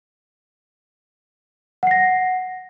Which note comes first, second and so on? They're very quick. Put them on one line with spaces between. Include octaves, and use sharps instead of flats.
F#5 C7 A#6